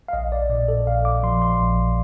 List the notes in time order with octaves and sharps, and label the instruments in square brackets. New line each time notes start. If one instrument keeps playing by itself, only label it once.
[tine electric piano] F5
A#1 D#5
D5
A#2 D5
A4
A#1 F5
D6
F3 C6
C6
A#1